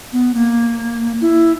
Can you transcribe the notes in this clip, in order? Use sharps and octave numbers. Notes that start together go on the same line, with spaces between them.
B3
A#3
E4